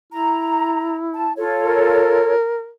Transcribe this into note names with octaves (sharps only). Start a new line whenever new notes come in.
E4 A#5
A5
F4 A4 C#5
A#4